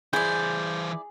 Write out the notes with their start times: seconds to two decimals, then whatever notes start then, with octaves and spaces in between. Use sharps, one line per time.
0.13 E3 E4 G#4 C5 D5 G6